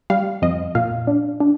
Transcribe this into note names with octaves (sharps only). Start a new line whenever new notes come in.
G3 F5
F2 D#5
A#2 F5
D4
D4